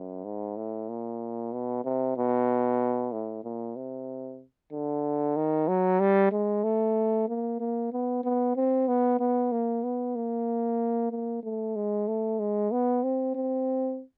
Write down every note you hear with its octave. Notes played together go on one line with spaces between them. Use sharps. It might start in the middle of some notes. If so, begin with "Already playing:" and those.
Already playing: F#2
G#2
A2
A#2
B2
C3
B2
A2
A#2
C3
D3
D#3
F#3
G3
G#3
A3
A#3
A#3
B3
B3
C4
B3
B3
A#3
B3
A#3
A#3
A3
G#3
A3
G#3
B3
C4
C4